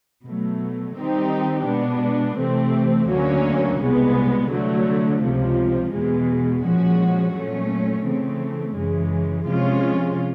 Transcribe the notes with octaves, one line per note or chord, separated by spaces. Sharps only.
B2 F#3 A3
D#3 G3 C4 D#4 G4
B2 G#3 B3 D4
C3 E3 A3 C4
D2 D3 F#3 A#3 C#4
C2 B2 G#3 B3
D3 F#3 A3
C#2 C3 F3
E2 B2 G#3
A#2 F3 G#3 C#4 F#4
A#2 F#3 A3 C#4
C#3 E3 A3 C4
F#2 C#3 E3 G#3
C3 F3 G#3 C#4 F4